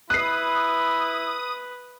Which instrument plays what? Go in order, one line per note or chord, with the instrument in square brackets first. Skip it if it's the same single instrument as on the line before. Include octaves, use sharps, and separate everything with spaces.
[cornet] E4 [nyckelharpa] B4 [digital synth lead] D#6 [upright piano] F#6 C7